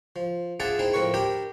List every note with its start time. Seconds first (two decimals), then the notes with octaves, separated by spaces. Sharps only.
0.16 F3
0.60 D4 F4 G#4 E5 F#5 A5
0.79 C4 D#4 E4 G#4
0.93 A2 F3 C4 A#4 B4 C#6
1.14 D4 G4 A#4 G5 B5